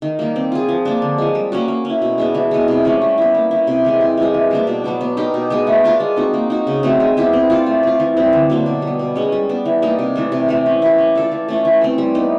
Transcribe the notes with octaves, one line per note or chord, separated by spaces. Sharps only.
D#3
G3 A#3
C4
F4 G#4
F3
A#3 D4
D3
F3 G#3
G3
A#3 C#4 F#4
A#3
C#4 E4
B2
G#3 B3 D4
E3
G#3 B3
C3
F3 A3 C#4
G3
B3 E4
A#3
C#4 E4
C3
E3 G#3 C4
C3
F3 G#3
E3
G3 A#3 D4
B2
F#3 B3 D4
B3
D#4 G4 A#4
B2
G#3 B3
A3
D4 F4 A#4
G#3
C4 D#4 F#4
A#3
D#4 F#4
C#3
F#3 A3 C4
G#3
B3 E4 G4
C4
F4 A4 D5
A3
C4 F4
E3
G3 C4 E4
D3
F#3 A#3 D4
B2
G3
B3
B2
G#3 C#4
G3
B3 D4
E3
G3 A#3 D#4
C3
E3 A3 D4
C3
E3 A3
C#4
E4 G4
C#4
F4 A4 D5
E3
A3 C#4 F4
E3
A3 C4
G3
B3 D#4